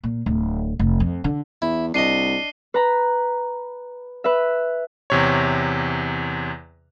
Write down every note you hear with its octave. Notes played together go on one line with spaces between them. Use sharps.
A#2
D1
F1
F2
D3
E2 E4
C2 D4 D#5 C7 D#7 G7
B4 A#5 B5
B4 E5
E2 C3 C#5